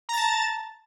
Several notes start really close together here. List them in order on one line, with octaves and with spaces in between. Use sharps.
A#5 A6 A5